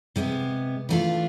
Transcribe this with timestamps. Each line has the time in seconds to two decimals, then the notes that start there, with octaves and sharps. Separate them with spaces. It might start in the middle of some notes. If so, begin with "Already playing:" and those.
0.16 C3 G#3 B3
0.89 E3 A3 D4 F4